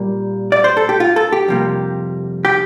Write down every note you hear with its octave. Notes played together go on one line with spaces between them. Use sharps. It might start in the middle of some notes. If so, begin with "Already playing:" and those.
Already playing: A#2 G3 A#3
D5
C5
A4
G4
F4
A4
G4
F2 C3 G3 A#3
G4